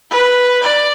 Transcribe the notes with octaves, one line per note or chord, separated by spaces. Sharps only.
B4
D5